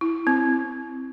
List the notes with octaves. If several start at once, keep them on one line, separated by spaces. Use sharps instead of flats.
E4
C4